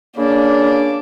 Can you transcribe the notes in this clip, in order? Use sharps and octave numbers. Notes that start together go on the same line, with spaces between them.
A#2 C#3 A#3 D4